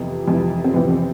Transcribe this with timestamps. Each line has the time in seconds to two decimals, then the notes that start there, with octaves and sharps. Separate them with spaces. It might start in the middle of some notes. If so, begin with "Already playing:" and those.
Already playing: F2 C3 E3 B3
0.28 F2 C3 E3
0.64 C4
0.74 F2 C3 E3 B3
0.90 C4